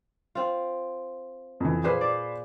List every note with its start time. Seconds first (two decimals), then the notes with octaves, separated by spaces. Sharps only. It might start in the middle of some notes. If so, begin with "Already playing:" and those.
0.35 C4 F4
1.60 F2 E3
1.84 A#2 G#4 B4 C5
2.01 D5